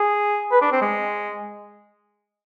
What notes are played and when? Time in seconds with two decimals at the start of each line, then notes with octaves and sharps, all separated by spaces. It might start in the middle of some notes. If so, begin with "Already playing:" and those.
Already playing: G#4
0.51 B4
0.62 D4
0.72 C4
0.82 G#3